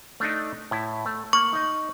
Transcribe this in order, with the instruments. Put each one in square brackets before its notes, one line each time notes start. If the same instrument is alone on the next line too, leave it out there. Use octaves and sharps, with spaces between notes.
[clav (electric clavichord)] A3 D4 D#4
A2 E4
A3
[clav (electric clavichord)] A#3 [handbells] C#6
[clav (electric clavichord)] D#4 D#5